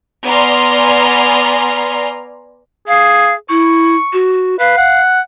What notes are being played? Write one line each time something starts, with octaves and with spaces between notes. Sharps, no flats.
B3 D5 G#5 A#5 C6 F6
G#4 F5
E4 C#6
F#4
B4 F5
F#5